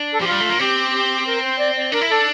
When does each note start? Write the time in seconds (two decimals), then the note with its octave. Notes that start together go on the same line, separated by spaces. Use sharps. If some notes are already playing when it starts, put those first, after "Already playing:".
Already playing: D4
0.12 A4
0.20 F3 G4
0.27 G3 F4
0.40 A3
0.50 A#3
0.59 C4 G4
1.26 A#4
1.42 C5
1.58 D5
1.76 D5
1.92 D4 A#4
2.01 E4
2.08 D4 A4